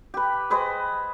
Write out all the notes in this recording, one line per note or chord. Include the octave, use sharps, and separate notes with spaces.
G4 B4
G#4 B4 C5 D#5